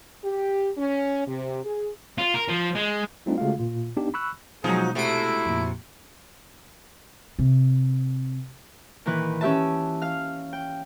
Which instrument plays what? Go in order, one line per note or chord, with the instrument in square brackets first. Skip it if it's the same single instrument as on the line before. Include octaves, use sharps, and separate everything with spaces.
[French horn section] G4
C#4
C3
G#4
[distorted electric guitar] F4
A#4
F3
G#3
[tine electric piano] G3 A3 C4 D4 D#4 F4
C#3 G#3 A3 F4 F#4 F5
A#2 F4
B3 D4 D#4 G4
B5 C#6 E6 F#6
[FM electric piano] B2 G#3 [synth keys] F3 F#3 [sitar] D#4 [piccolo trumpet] G#4
[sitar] C3 F#4 [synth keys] A3 D7 [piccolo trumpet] E4
[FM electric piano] F2 A#2
[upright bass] C3
[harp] A#2 D#3 E3 B4
C#4 G4 E5 A5
F5 F6
G5